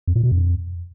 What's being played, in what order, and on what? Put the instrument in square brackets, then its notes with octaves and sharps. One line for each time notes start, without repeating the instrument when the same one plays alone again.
[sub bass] F2
A#2
B2
F2